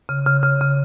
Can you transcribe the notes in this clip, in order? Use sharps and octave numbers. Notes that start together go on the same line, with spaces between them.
C#3
C#3
C#3
C#3